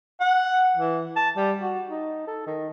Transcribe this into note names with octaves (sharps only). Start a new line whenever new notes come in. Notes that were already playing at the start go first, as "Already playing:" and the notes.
F#5
E3
A5
G3
F#4
D#4
A4
D#3